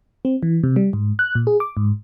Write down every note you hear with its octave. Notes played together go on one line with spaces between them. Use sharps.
C4
E3
C3
G3
G#2
F#6
A#2
G#4
D6
G#2